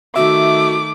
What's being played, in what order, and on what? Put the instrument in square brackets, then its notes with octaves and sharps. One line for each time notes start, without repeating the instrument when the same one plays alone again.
[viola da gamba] D#3 A3 [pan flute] F#4 [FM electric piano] E5 [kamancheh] D6